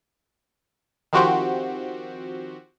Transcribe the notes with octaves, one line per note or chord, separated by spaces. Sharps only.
D#3 F3 C4 F#4 G4 C5